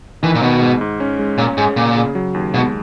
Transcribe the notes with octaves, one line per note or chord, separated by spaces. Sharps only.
D#3 E3
A#2
B2 D#3
G#2
G#2
C#4
G#3
A#2 C#4
G#2 G#4
A#2 C#3
C#3
F#3
D#2
B2 G#3